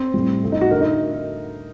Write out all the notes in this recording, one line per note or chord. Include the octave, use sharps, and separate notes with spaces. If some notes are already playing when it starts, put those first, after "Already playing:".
Already playing: C4
A2 G3
A2 A3
D#4
F#4
D3 A3 A#4
D#4